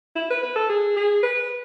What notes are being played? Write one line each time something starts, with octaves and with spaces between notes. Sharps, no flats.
E4
B4
B4
A4
G#4
G#4
B4